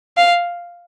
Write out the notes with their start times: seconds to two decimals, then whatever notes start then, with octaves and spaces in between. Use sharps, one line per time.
0.17 F5